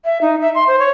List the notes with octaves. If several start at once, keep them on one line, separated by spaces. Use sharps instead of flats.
E5
D#4
E5
C6
C5
C#5